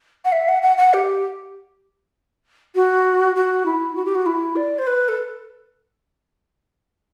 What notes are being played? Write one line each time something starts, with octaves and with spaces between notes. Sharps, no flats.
F#5
E5
F#5
F#5
F#5
G4
F#4
F#4
E4
F#4
G4
F#4
E4
D5
C5
B4
A4